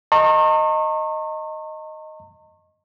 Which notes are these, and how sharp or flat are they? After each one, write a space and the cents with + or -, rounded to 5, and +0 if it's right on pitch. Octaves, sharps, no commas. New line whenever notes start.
D#5 +0 A#5 -40 C#6 -40